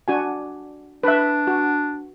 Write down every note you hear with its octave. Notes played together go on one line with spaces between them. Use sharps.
D4 F#4 G#5
D4 B4 E5
F#4